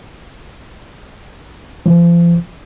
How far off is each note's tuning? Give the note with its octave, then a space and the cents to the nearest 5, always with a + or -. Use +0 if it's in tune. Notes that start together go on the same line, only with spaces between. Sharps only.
F3 -35